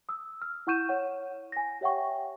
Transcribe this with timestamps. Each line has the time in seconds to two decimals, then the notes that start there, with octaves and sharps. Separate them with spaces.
0.09 D#6 E6
0.42 F6
0.67 E4 F#5 C#6 G6 D#7 E7
0.89 C#5 F#5
1.52 G#5 A#6
1.81 G4 C#5 E5 F#5 G5 C#6